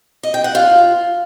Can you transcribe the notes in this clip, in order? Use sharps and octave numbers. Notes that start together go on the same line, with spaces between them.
D#5
G5
F#5
F4